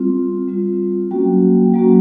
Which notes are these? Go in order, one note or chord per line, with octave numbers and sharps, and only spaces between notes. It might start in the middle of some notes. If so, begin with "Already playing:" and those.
Already playing: G3 C4 F4
G3 C4 F4
F#3 A#3 C#4 F#4 G5
F#3 A#3 C#4 F#4